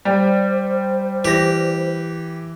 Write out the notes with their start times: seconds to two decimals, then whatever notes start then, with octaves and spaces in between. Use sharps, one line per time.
0.05 G3 C5
1.25 E3 G4 A#6